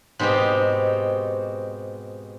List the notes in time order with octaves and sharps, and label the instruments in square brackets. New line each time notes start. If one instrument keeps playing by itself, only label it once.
[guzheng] G#2 B2 C4 D#4 G4